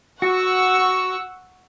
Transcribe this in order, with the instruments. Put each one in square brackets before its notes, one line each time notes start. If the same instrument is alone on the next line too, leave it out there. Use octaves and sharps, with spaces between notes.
[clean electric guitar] F#4 [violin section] F#5 C#6 E6